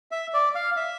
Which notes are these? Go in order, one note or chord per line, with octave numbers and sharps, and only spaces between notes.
E5
D5
F5
E5